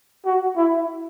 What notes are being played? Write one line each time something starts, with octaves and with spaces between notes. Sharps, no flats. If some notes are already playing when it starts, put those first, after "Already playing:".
F#4
E4